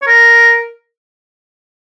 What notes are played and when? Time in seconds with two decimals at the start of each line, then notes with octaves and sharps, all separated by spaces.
0.02 C#5
0.07 A#4